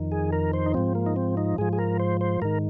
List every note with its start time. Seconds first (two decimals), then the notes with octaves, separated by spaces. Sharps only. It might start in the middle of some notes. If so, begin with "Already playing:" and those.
Already playing: F2 D#3
0.12 G#4
0.32 A#4
0.53 C5
0.66 D#4
0.74 G#2 F3 C4
0.95 A#3
1.06 D#4
1.16 C4
1.37 D#4
1.58 G#2 F3 G#4
1.73 G#4
1.78 A#4
2.00 C5
2.21 C5
2.42 G#2 D#3 A#4